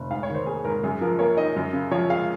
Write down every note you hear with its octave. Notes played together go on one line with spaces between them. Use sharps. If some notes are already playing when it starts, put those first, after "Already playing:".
Already playing: F1
G#2 F5
C#5
D#3
C5
A#3 G#4
G#2 A#4
F#2 G#4
F3 A#4
A#3 C#5
D#4 D#5
F#2
C#3
F3 C#5
G#3 F5